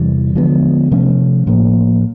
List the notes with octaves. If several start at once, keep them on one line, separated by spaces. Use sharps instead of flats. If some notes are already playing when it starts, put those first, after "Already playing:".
Already playing: E2 C3 E3 G3
D3 F3 G#3 B3
C3 F3 A3 C#4
A2 F3 A#3